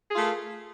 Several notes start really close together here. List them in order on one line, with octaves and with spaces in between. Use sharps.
G#4 F4 A3 A#4